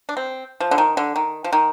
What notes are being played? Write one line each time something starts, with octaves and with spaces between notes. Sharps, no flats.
D4
C4
F3
D3
D#3
D3
D#3
F3
D#3